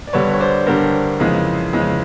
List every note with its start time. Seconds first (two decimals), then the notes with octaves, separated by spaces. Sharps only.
0.07 D5
0.13 G2 D3 G3 B4 C#5
0.34 C#5
0.40 C5 D5
0.66 G2 D3 G3 A#4 C5
1.20 F2 C#3 E3 G#3
1.73 F2 C#3 E3 G#3